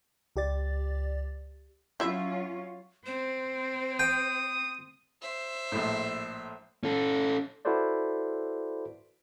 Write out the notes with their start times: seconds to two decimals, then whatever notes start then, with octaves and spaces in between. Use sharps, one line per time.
0.36 C#2 G4 D5 A6
2.00 F#3 C#4 E4 F4 E5
3.06 C4 C5
3.99 G5 D#6
5.22 C5 E5
5.72 A#1 A2
6.84 C#4 A4
7.65 E4 F#4 A4 B4 C5 D5